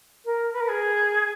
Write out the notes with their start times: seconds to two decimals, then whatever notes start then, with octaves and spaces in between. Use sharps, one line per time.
0.25 A#4
0.53 B4
0.60 A#4
0.68 G#4